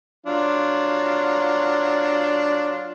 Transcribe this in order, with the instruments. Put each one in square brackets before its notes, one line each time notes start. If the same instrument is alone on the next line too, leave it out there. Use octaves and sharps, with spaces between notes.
[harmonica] F#3 D4 F4